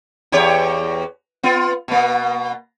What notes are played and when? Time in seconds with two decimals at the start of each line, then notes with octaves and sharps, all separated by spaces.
0.32 E2 G4 C#5
1.43 B3 F4
1.88 B2 A#3